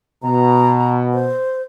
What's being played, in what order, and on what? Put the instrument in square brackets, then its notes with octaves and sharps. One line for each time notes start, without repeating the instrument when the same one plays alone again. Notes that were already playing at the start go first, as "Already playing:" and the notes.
[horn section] B2 [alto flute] A#5
[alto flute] C5